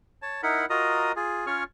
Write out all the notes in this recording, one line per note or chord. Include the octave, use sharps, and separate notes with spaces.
C#5 A5
D#4 E4 A#4 F#5 B5
F4 F#4 A#4 D#5 A#5 D#6
F4 G#4
C#4 F4 C#5 C#6 F6